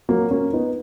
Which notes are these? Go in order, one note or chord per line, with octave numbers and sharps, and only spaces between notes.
F#3 A#3
A#3 C#4
B3 D#4